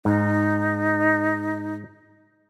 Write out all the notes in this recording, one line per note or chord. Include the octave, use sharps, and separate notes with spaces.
G#2 D#4